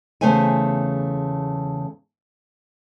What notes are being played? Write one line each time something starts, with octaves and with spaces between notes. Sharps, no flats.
E2 C#3 A3 C5 E5 G#5